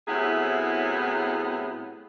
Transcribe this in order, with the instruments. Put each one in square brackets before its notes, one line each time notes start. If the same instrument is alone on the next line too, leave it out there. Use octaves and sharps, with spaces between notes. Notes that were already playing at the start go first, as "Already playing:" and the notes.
[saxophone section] A2 C3 F#3 B3 E4 G#4